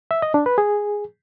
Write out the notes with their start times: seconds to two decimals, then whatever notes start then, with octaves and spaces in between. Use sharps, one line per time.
0.11 E5
0.22 D#5
0.34 D4
0.46 B4
0.58 G#4